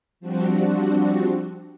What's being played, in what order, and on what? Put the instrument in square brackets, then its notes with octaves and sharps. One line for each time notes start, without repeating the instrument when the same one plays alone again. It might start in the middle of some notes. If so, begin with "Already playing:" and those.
[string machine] F3 G3 C4 D4 F#4